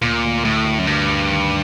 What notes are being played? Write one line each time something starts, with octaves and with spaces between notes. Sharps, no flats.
D2 A#2
D2
D2 A2
D2
F#2
D2 G2
D2
D#3